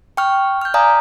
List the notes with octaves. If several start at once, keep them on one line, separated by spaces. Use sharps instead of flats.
G5 C#6 F6
F6 G6
D5 F5 G#5 A#5 D#6